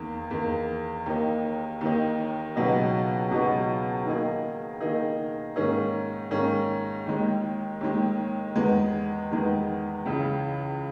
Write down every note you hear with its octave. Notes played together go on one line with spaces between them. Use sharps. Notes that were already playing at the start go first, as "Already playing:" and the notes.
Already playing: E2 D#3 A#3
E2 D#3 A#3
D#2 D#3 A#3 D#4
D#2 D#3 A#3 D#4
C#2 B2 F#3 B3 D#4
C#2 B2 F#3 B3 D#4
D#3 A#3 D#4 G#4
D#3 A#3 D#4 G#4
G#2 D#3 A#3 C#4 G#4
G#2 D#3 A#3 C#4 G#4
D#2 D#3 G#3
D#2 D#3 G#3
E2 D#3 G#3 B3
E2 D#3 G#3 B3
C#2 C#3 E3